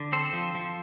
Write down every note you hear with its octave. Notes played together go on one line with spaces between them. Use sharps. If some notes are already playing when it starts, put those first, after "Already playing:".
Already playing: D3
C4 A4 C5
F3
F3